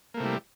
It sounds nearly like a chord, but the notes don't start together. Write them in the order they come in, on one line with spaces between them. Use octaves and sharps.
A#3 A3 C3 E4 G3